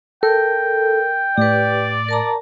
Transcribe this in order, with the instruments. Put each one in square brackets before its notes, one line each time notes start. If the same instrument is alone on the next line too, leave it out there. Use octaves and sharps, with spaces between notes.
[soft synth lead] A4 [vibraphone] A#4 [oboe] G5
[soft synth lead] A2 [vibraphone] G4 B4 [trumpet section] D5
[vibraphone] A#4 A5 A#5